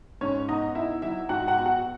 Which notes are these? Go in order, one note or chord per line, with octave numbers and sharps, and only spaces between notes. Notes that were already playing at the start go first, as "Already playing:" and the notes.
G#2 C#4 C#5
B3 D#4 D#5
D#4 E4 E5
F#3 E4 E5
G#2 F#4 F#5
F#4 F#5
B3
F#4 F#5